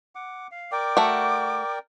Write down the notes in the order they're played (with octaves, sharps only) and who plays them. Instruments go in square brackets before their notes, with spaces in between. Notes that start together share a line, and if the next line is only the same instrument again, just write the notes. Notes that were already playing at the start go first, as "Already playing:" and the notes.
[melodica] F#5 D6
F5
[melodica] A#4 D5 G5 [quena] D6
[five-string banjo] A3 F#4